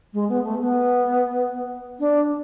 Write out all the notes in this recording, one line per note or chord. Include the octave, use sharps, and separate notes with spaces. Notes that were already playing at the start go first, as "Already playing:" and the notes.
G#3
B3
A3
B3
D4